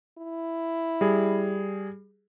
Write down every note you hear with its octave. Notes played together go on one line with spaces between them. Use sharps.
E4
G3 G#4